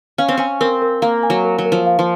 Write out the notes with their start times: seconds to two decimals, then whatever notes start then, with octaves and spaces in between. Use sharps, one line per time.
0.18 C#4 F5
0.29 C4
0.37 C#4 G#5
0.61 C4 A#4
0.82 A#4
1.02 A#3 F5
1.23 G#5
1.30 F#3
1.45 A#4
1.58 F#3
1.66 A#4
1.72 F3
1.87 F5
1.99 F3